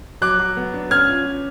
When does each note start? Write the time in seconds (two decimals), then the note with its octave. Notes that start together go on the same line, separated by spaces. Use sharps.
0.22 F#3 D6 F#6
0.39 F#3
0.57 B3
0.74 D4
0.91 C#4 F6 G#6
1.08 F4
1.26 F4